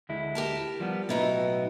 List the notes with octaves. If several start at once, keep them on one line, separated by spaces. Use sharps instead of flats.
D2 G#3 E4
G4 A#4 A5
F3 G3 B3
B1 A2 B3 D#4 E4 F#4